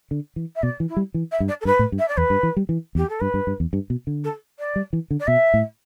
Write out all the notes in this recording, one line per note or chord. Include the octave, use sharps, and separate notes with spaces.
D3
E3
E5
B2 D5
E3
E4
G3
E3
E5
G2
D5
A4
G2 B4
A2
G2
E5
D5
E2 B4
G2
E3
G3
E3
E2 G4
A4
G2 B4
G2
G2
E2
G2
B2
D3
A4
D5
G3
E3
D3
D5
B2 E5
A2